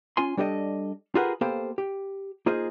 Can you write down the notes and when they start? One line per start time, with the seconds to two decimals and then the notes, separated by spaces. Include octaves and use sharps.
0.17 C#4 F4 G#5 C6
0.37 G3 D4 G4 A4 D#5
1.15 F4 G4 G#4 A#4 B4 F#5
1.41 A#3 B3 G4 A4 C5 F5
1.78 G4
2.46 A#3 D#4 F4 G#4 C5 D#5